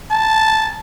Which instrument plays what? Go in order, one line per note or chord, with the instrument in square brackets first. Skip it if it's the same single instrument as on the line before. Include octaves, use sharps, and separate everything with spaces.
[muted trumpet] A5